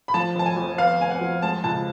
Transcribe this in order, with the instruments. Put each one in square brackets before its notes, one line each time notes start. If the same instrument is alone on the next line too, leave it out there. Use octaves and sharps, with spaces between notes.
[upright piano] B5
F3 A5
F1 A5
G#5
F2
B3 F5
F1 G#5
F#5
F2
G#3 A5
C#2 A5